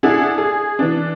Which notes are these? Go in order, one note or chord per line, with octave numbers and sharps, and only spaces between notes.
D4 E4 G#4 F#5
G#4
E3 D4